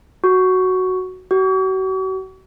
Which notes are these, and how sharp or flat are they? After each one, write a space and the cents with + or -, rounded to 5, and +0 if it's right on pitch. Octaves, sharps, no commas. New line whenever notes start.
F#4 +5
F#4 +40